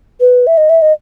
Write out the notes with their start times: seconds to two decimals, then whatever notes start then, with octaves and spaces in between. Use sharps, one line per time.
0.20 B4
0.47 E5
0.57 D#5
0.70 E5
0.82 D#5